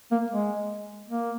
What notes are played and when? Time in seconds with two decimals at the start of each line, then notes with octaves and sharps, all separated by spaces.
0.11 A#3
0.31 G#3
1.08 A#3